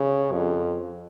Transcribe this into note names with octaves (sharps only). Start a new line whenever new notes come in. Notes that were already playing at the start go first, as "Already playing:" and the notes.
Already playing: C#3
F2